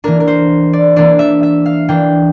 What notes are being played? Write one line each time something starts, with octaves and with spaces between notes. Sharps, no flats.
E3 A#3 D4 A#4
A#4
C5
D5
E3 A#3 D4 D5
E5
E5
F5
E3 A#3 D4 G5